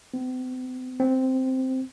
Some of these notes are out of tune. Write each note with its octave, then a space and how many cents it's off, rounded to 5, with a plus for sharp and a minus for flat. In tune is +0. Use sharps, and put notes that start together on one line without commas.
C4 -45
C4 -5